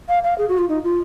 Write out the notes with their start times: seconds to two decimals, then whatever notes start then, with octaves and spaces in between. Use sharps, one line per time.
0.09 F5
0.24 F5
0.38 G#4
0.49 F#4
0.58 F4
0.69 D#4
0.84 F4